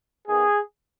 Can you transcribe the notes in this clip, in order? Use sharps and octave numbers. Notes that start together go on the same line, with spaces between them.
D#3 B3 G#4